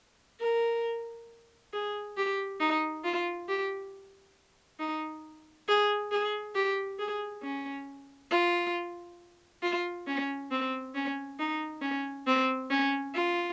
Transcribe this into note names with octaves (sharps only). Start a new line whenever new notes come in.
A#4
G#4
G4
D#4
F4
G4
D#4
G#4
G#4
G4
G#4
C#4
F4
F4
C#4
C4
C#4
D#4
C#4
C4
C#4
F4